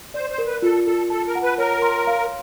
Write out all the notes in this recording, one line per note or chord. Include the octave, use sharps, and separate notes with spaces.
C5 D5
C5
A#4
B4
F4 A4
F4 A4
A4 A5
A#4
F#5
B4
A#4 C#5
C6
F5